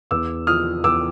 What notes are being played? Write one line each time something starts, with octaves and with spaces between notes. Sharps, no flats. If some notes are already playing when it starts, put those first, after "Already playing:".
E2 D6 E6
F3 D#6 F6
E2 D6 E6